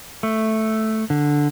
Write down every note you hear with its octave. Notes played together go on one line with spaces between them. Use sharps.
A3
D3